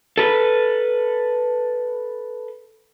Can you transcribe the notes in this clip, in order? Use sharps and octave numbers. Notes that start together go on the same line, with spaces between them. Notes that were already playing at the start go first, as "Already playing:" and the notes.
A4 B4